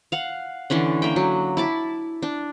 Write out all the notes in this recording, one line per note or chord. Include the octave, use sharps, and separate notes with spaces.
F5 F#5
D3 E3 C#4 D4
A#3 E5 G5
F#3
E4 A5 D6
D4